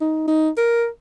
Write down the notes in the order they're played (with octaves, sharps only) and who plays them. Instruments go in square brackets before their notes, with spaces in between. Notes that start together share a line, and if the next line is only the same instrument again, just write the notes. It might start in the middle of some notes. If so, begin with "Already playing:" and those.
[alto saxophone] D#4
D#4
A#4